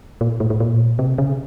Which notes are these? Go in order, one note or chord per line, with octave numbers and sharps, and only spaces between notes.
A#2
A2
A2
A#2
C3
C#3